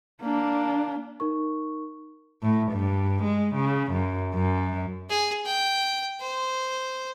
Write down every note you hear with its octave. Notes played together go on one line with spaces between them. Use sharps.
A#3 D4
D#4 A#4 C#6
A2
G2
G#3
C#3
F#2
F#2
G#4
G5
C5